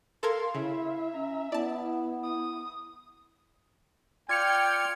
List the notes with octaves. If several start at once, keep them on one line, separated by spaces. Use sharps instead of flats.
A4 A#4 F5 C6 G#6
C#3 E4 E5
C#4 A#5
B3 E4 D5 A5
D#6
F4 D5 G5 F6 G#6 C#7 F7